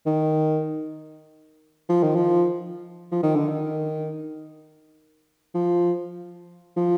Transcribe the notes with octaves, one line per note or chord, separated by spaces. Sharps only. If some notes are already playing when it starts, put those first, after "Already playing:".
D#3
F3
D#3
F3
F3
D#3
D3
D#3
F3
F3